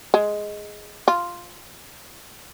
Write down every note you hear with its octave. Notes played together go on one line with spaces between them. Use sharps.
G#3
F4